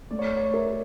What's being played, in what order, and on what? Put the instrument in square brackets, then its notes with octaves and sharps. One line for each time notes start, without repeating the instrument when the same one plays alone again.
[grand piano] A3 [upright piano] D5
[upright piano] C#5
D5
C#5
D5
[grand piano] A#4 [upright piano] E5